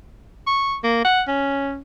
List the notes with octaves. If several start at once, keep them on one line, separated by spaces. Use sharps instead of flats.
C#6
A#3
F#5
C#4